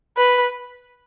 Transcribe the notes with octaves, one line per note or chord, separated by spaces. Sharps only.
B4